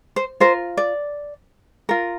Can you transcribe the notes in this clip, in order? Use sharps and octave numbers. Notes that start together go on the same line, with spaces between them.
C5
F4 A#4 C5
D5
F4 A#4